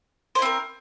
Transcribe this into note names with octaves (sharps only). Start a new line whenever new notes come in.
C4 E4 A#4 C5